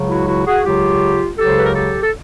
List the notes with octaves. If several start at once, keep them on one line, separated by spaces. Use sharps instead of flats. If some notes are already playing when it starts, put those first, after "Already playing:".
Already playing: C#2 C#3 F#3
E4 F#4
E4 F#4
F#4 G#4
C#2 C#3 F#3 F4 G4
C#2 C#3 F#3 G4 A4
C5
B4
A#4
G4 A4
A4